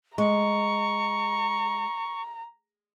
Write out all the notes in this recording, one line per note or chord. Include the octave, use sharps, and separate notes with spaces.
G#3 A#5 C#6